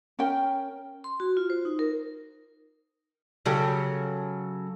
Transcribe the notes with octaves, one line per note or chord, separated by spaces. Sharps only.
C#4 A#4 G5
C6
F#4
F4
C5
D#4
A#4
C#3 F#3 G4 A4